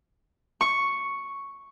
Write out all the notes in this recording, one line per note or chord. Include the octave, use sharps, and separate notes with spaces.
C#6